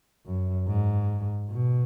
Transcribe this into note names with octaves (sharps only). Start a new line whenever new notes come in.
F#2
G#2
B2